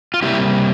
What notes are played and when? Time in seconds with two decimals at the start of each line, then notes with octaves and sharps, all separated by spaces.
0.14 F4
0.22 C3 G3 A#3 E4 G4